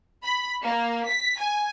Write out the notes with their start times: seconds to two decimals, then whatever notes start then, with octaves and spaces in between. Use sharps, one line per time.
0.24 B5
0.63 A#3
1.07 B6
1.39 G#5